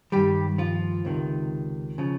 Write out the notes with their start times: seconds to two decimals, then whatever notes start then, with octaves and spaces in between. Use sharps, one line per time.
0.12 G2 D#3 G3 G4
0.58 F3 F4
1.05 C#2 C3 D#3
1.98 C#3 F3